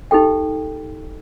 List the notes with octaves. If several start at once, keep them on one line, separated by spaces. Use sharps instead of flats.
D#4 G4 A4 G5